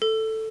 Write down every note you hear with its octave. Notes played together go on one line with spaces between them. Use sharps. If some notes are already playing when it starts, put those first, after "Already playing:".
A4